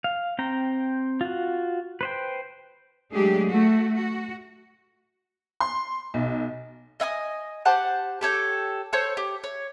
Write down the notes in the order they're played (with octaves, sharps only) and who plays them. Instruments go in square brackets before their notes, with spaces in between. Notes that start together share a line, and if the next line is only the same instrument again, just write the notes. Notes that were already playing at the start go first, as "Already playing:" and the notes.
[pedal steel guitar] F5
C4 G5 A#5
F4 F#4
B4 C5 G5
[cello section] F#3 G#3 A3 D4 G4 G#4
A3 F#4
F#4
[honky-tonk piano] C6
B1
[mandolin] D#5 E5 G#5 D#6
G4 C5 F#5 A5
G4 A4 C#5 G5
A4 C5 C#5 G6
G4
C#5